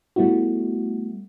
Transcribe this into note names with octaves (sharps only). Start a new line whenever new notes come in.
G3 A3 B3 E4 F#4